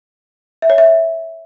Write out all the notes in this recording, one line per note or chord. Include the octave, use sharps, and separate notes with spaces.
E5
C#5
E5